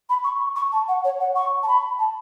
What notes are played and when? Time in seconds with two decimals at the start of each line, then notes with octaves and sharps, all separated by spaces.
0.09 B5
0.24 C#6
0.40 C#6
0.56 C#6
0.72 A5
0.88 F#5
1.04 C#5
1.20 F#5
1.36 C#6
1.63 A5
1.68 B5
1.99 A5